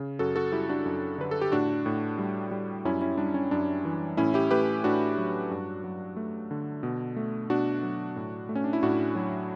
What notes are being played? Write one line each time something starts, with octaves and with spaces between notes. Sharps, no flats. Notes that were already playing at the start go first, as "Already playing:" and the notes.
Already playing: C#3
F#2 F#4 A4
F#4 A4
G3 E4 G4
D4 F#4
F#2
D3 B4
A4
G4
A2 D4 F#4
A2
G3
G3
F#2 C#4 E4
C#4 E4
G3 D4
C#4
F#2 D4
E3
A2 C#4 E4
E4 G4
A3 G4 B4
A2 D4 F#4
F#3
G2
F#3
A3
D3
B2
A3
B2 D4 F#4
F#3
A2
A3
C#4
D4
E4
A2 D4 F#4
F#3